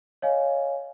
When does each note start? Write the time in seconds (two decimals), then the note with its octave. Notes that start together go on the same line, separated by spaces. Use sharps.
0.22 C#5 D#5 F5 G#5